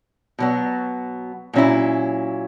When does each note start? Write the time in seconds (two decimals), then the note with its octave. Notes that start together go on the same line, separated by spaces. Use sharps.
0.39 B2 F#3 B3
1.53 A#2 F#3 C#4 E4